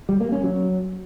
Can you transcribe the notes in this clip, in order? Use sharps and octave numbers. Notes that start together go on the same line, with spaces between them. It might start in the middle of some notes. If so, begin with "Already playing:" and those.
G3
A#3
C#4
F#3